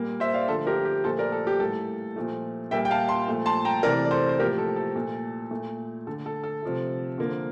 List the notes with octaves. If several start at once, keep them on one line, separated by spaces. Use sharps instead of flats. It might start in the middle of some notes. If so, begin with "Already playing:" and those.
Already playing: A#2 G3 A#3
C5 E5
D5 F5
D3 F3 A3 A4 C5
G4 A#4
G4
A#2 F3 A3 A4 C5
A#4 D5
A4
G4
A2 G3 A#3 A4
A#2 F3 A3
A#2 G3 A#3 E5 G5
G5
F5 A5
A5 C6
A#2 F3 A3
A5 C6
G5 A#5
C3 E3 A3 A#4 D5
D5
A4 C5
C5
A2 F3 A#3 G4 A#4
A4
A4
A#2 A3
A#2 A3
D3 A3 A4
A4
A4
C3 F3 A3
D3 F3 A#3